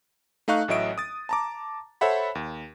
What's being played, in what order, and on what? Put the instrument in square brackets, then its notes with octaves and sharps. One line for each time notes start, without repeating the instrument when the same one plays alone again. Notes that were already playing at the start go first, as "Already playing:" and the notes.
[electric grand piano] A3 D#4 F5 C#6 F#6
A1 A2 F#3 D#5 E5 D7
D#6 A6
A5 A#5 D6
A4 C5 C#5 E5 F#5 B5
D#2